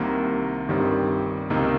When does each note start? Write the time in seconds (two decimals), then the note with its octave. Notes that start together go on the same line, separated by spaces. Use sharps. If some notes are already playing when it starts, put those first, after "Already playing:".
Already playing: C2 C3 D#3 A#3
0.68 G1 G2 D#3 G3 C4
1.50 C#2 C3 D#3 A#3 D#4